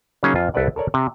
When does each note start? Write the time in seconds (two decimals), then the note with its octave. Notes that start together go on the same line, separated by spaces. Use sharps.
0.23 C#3 F#3 A#3 C#4 D#4 G#4
0.35 F2 F4 G#5
0.54 C2 A4 B4 D5 F#5
0.76 A4 A#4 C#5 D5
0.94 C3